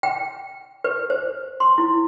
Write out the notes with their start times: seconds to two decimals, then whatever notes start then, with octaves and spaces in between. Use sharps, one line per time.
0.03 G5
0.84 B4
1.10 C5
1.60 C6
1.78 E4